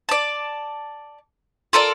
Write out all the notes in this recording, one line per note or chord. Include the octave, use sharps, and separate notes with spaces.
D5 A5
F4 A4 A#4 D5